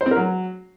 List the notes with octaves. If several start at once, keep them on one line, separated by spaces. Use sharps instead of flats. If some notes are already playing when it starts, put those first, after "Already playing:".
C5
C4
A#4
F#3